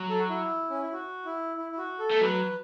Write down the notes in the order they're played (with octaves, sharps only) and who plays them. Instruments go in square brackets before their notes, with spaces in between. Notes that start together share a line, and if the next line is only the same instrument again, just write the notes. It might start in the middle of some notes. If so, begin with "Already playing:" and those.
Already playing: [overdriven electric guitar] F#3
[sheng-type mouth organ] A4
F#4
E4
C#4
E4
F#4
E4
E4
E4
F#4
A4
[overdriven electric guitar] A3
[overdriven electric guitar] F#3 [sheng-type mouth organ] B4